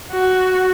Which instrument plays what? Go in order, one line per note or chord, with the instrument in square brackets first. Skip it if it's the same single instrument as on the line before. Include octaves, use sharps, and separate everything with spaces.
[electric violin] F#4